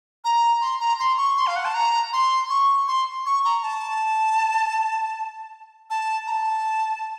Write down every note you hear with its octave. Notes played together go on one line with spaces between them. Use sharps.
A#5
C6
A#5
C6
C#6
C6
F5
F#5
A5
A#5
C6
C#6
C6
C#6
A#5
A5
A5
A#5
A5